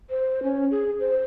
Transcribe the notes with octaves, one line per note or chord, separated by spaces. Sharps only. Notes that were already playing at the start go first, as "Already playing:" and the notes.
C5
C#4
G#4
C5